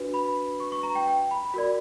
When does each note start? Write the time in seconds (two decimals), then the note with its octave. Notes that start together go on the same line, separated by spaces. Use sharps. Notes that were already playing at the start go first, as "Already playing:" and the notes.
Already playing: D4 F#4 B4
0.14 B5
0.60 C#6
0.72 C#6
0.83 A#5
0.95 G5
1.07 G5
1.31 B5
1.54 F#4 A#4 D5